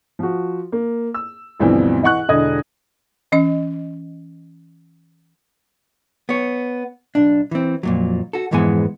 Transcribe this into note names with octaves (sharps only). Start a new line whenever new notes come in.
F3 F#4
A#3
E6
D2 G2 B2 E3 F3 C4
E3 D#5 F#5 C#6 F#6
E1 D3 E4 D#5 D#6 G#6
E3 C#4 D#5
B3 C#5
B1 D4
E3 C4
F2 A#2 F#3
F#4 A4
F2 G#2 E3 G#3 B3 G#5